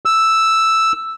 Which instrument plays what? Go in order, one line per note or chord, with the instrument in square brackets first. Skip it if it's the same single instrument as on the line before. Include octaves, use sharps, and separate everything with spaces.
[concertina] E6